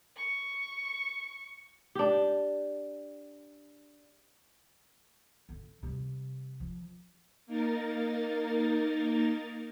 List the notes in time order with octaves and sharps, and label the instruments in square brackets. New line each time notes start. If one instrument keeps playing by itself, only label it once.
[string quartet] C#6
[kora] D4 G4
[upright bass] D3
C3 G3
F3
[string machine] A#3 D#4 A#4 A6